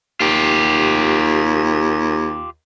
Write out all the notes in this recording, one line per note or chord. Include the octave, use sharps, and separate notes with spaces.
D#2 F4 G4